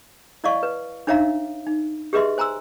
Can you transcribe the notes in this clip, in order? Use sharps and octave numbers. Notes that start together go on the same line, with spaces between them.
E4 D5 D#5 F5 C#6
B4
D4 D#4 C#5 E5 F5 A#5
D#4
G4 G#4 B4 D#5 E5 C6
C5 G#5 A#5 C6 E6